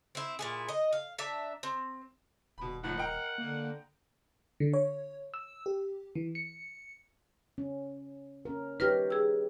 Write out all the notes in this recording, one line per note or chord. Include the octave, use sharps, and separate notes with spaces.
C4 E4
A#2 E4 G#4
D#5
F5
D4 E5 A#5
C4
D#1 B2 B5
F#1 A2 F3 D#4 F#5
A#4 D#5 G5 A#5
D3 A#3
D3
C#5
E6
G4
E3
C#7
C#4
C#4 A#4
D#4 G4 B4 C#5 F6 A#6
G#4 E6